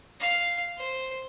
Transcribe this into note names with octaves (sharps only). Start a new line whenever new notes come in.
F5
C5